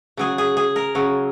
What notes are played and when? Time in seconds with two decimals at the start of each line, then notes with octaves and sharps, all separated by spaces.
0.17 C#3 F#3 G#4
0.38 G#4
0.57 G#4
0.76 A#4
0.95 C#3 F#3